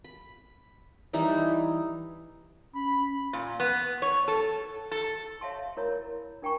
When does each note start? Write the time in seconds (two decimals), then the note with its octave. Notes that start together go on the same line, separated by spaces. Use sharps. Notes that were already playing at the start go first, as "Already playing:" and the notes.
0.04 B5
1.13 E3 G3 D#4 E4
2.74 C#4 B5
3.33 A#2
3.60 B3
4.02 C#5
4.28 A4
4.91 A4
5.41 C#5 E5 F5 A5 C6
5.77 E4 A#4 C#5 A#5 B5
6.42 D4 A#4 G5 G#5 A#5 C#6